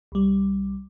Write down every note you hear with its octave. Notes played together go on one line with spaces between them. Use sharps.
C2 G3